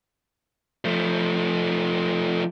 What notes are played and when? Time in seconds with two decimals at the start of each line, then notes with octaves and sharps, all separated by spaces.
0.85 F3 A3